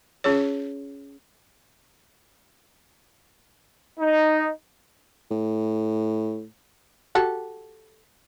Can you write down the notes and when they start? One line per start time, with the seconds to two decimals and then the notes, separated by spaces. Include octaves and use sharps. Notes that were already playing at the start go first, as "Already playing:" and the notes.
0.24 C#4 F4 G#4 C#5
3.99 D#4
5.31 A2
7.15 F#4 G4 A4